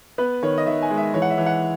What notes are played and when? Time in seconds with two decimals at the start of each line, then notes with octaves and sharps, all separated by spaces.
0.18 B3 B4
0.43 D#3 C#5
0.58 D#5
0.66 D#3 E5
0.82 G#5
0.90 G#3
0.97 E5
1.14 E3 C#5
1.22 F#5
1.30 E5
1.38 E3
1.46 F#5